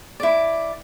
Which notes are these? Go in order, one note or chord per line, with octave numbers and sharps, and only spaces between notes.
E4 D5